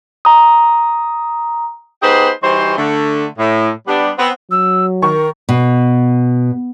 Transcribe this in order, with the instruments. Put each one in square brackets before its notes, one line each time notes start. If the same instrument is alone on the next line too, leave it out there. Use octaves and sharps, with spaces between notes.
[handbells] A#5 D#6
[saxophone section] B3 D#4 G4 G#4 B4 C5
E3 G3 D#4 F#4 C5
D3 A3
A2
G3 B3 D4
B3 C4
[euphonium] F#3 [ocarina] E6
[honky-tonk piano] D#3 C#6 [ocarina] A#4
[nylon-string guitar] B2